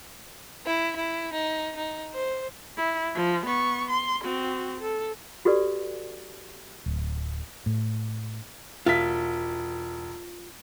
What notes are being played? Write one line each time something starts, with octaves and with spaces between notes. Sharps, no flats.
E4
E4
D#4
D#4
C5
E4
F3
B3 C#6
C6
C4 F#4
A4
F#4 G4 A4 B4 D5
D1
A2
E1 F4 E5 B6